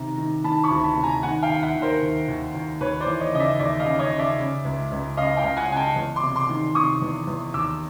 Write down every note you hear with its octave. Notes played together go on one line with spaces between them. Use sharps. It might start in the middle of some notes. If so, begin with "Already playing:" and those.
Already playing: C3 D#3 A#5
D#3
D#3 A5 B5
B5 C#6
D2
A5 B5
C3
G#5 A#5
D#3 F#5 G#5
F5 G5
D#2
E5 F#5
D#3
A#4 C5
D#2
D#2
D#2
D#2 B4 C#5
C5 D5
E3
C#5 D#5
C#3 D#5
D5 E5
D#2 D5 E5
D#5 F5
C#3
C#5 D#5
C#3
D5 E5
C#3
C#2
C#2
C#3 D#5 F5
F5 G5
C#2
F#5 G#5
C#3 G#5
G5 A5
E2
C6 D6
C3
C6 D6
D#3
C3 C#6 D#6
E2
E2
D#2 D6 E6